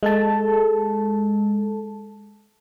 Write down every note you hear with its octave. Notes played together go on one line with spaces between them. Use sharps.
G#3 A4 A5